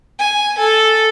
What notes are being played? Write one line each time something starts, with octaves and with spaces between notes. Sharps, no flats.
G#5
A4